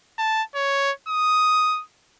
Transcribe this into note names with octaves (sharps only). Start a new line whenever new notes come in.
A5
C#5
D#6